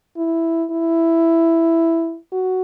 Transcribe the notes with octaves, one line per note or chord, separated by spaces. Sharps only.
E4
E4
F#4